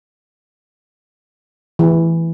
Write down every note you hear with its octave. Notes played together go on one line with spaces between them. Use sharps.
E3